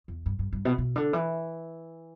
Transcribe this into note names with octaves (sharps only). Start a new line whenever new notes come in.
E2
G2
G2
G2
B2
B2
D3
E3